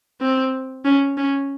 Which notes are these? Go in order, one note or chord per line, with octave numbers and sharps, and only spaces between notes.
C4
C#4
C#4